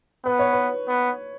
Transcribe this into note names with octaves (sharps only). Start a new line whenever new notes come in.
B3 B4
C#5
B4
B3